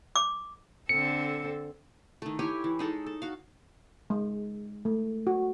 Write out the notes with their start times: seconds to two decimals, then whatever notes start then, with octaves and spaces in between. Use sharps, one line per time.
0.16 D6
0.89 D3 C4 A4 C#7
2.22 D#3 A3
2.39 E4 G4 C#5 G#5
2.64 E3
2.79 G#3 D#4 A4
3.06 A4
3.22 F#4 F5
4.10 G#3
4.85 A3
5.27 F#4